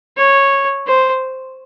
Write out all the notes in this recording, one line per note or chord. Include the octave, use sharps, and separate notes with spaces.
C#5
C5